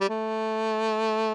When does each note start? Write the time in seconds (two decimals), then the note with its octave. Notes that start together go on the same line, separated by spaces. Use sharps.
0.01 G3
0.09 A3